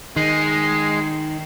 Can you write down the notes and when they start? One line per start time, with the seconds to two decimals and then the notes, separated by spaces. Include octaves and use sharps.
0.17 D#3 G#3 D#4 C7